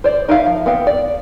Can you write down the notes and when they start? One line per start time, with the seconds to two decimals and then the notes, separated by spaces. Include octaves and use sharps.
0.04 C5 D5
0.29 D#4 A#4 E5 F5
0.46 F3
0.66 B3 C4 F5
0.87 D5